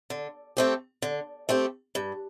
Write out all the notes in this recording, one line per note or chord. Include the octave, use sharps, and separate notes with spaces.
D3
A3 C4 G4
D3
A3 C4 G4
G2